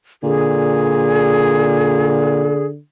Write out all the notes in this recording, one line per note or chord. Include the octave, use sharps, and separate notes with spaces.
A#2 D3 G#4